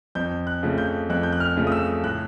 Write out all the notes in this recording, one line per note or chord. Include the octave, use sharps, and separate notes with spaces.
F2 G6
F#6
C#3 F3 A3
G6
F2 F#6
G6
F#6
F6
C#3 F3 A3
D#6
E6
A2 F#6